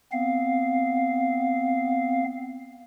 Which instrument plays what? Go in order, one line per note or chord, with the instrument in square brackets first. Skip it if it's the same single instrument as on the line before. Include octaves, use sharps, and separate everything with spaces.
[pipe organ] B3 C4 F5